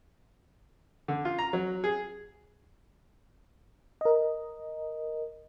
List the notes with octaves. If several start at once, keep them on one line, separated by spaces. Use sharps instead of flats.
D3
F4
A#5
F#3
G#4
A#4 D#5